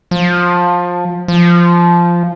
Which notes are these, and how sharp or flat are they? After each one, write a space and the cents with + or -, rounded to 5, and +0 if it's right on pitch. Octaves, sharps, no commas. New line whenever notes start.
F3 +20
F3 -10